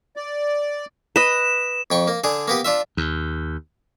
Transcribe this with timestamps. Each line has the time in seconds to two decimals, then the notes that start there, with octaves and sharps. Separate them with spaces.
0.16 D5
1.16 B4 D#5 E7
1.91 F2 G5 C#6
2.08 A#3
2.24 D3 D4 G#4
2.48 A#3 B3 G4
2.65 D4 F4 E5
2.97 D#2